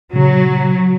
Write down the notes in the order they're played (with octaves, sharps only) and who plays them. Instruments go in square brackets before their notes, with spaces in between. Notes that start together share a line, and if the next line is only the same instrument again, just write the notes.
[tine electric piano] A#2 C#3 [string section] F#3